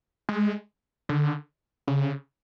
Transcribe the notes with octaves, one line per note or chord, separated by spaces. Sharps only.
G#3
D3
C#3